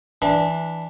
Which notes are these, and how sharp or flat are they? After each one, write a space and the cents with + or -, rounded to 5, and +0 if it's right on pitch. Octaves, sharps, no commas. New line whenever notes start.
E3 -5 D4 +0 B5 -40